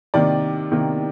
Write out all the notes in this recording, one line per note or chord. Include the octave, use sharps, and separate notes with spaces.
C3 D#3 A#3 D5
C3 D#3 A#3